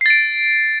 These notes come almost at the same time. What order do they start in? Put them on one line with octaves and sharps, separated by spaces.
C7 A6 D7